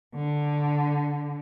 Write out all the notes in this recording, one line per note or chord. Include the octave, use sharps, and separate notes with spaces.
D3